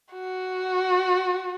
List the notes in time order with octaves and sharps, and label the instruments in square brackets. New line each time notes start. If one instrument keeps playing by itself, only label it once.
[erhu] F#4